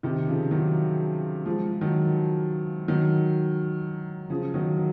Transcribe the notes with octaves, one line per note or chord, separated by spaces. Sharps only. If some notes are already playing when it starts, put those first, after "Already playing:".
C3 D#3
C#3 F3
D#3 F#3
F3 G#3
D#3 F#3
D#3 F#3
C#3 F3
D#3 F#3
F#3